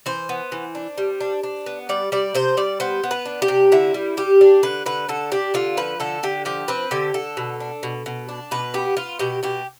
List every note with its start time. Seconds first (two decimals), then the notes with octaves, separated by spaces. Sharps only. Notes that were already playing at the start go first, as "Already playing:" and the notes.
0.06 E3 C5
0.29 B3
0.52 E3
0.75 D4
0.98 G3
1.21 D4
1.43 D4
1.66 B3
1.89 G3 D5
2.12 G3 D5
2.35 C3 C5
2.57 G3 D5
2.80 B3 C5
3.03 B3
3.11 B4
3.25 D4
3.42 G4
3.48 C3
3.72 D3 E4
3.94 G3
4.17 G3 G4
4.41 D4
4.63 D3 B4
4.86 D3 B4
5.08 D3 A4
5.32 D4 G4
5.54 D3 F4
5.77 F3 B4
6.00 D3 A4
6.23 D3 G4
6.45 F3 G4
6.68 C4 B4
6.91 D3 G4
7.14 D3 A4
7.37 B2
7.60 D4
7.83 B2
8.06 B2
8.29 D4
8.51 B2 B4
8.74 B3 G4
8.97 B3 F4
9.19 B2 G4
9.43 B2 G4